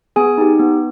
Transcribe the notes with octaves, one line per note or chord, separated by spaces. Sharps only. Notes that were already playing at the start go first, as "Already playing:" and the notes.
B3 G#4 G#5
D#4 G4
B3